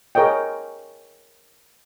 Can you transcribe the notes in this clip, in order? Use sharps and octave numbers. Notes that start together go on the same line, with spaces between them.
G#4 A#4 C#5 D#5 G5